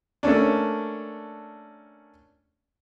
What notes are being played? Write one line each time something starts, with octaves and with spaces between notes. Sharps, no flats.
A3 A#3 C#4 D4